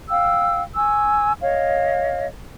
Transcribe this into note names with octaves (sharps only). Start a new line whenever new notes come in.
F5 G5 E6
G#5 C#6 E6
C#5 D#5 F5